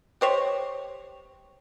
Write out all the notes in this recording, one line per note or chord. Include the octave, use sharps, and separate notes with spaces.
G4 C5 C#5